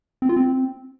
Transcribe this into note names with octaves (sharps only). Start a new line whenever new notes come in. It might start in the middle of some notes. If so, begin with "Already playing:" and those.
C4
F4
C4